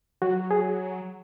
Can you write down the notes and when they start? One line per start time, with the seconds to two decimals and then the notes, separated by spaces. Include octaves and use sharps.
0.22 F#3 F#4
0.51 G#4